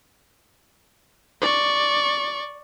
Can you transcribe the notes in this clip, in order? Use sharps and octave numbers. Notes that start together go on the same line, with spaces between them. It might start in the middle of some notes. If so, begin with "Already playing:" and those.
D5 C#6